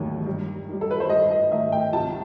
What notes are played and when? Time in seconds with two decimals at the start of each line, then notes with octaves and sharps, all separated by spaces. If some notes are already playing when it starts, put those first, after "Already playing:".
Already playing: E1 D#2 D#3 F#3 A3
0.26 G2
0.68 D#3 G3
0.81 A4
0.91 B4
1.00 C5
1.10 G2 D#5
1.31 D#5
1.51 D#3 A3 D#4 E5
1.72 G5
1.93 C2 A5